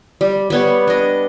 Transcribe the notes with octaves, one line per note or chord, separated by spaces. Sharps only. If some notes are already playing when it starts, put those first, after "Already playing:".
G3
G3 B3 C#5
D4 D#5